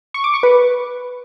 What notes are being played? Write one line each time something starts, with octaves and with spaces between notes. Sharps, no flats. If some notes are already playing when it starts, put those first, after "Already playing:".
C#6
D6
C#6
B4